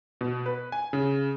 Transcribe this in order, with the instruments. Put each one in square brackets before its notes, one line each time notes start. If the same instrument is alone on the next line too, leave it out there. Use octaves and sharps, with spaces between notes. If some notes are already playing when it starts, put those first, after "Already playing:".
[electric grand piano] B2
B4
G#5
C#3